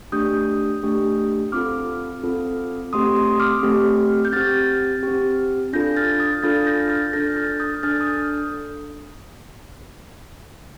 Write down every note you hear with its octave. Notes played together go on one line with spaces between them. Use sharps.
A3 D4 G4 D#6 G6
A3 D4 G4
C4 F4 A4 D6 F6
C4 F4 A4
A3 C4 G4 C6 D#6
C6 D#6
D6 F6
A3 C4 G4
G6
C4 G4 F6 A6
C4 G4
D4 F4 A4 G6 A#6
F6 A6
D#6 G6
D4 F4 A4 F6 A6
G6 A#6
F6 A6
D4 A4 G6 A#6
F6 A6
D#6 G6
D4 A4 F6 A6
D#6 G6